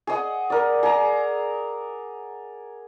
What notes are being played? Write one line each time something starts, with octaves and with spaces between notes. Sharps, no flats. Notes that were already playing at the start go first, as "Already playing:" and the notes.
G#4 D#5 F#5
A#4 D5
G#4 A#5